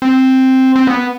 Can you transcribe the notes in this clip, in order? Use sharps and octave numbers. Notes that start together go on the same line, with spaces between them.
C4
C4
B3